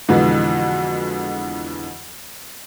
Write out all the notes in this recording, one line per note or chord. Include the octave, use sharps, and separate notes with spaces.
F2 B2 D3 E3 G#3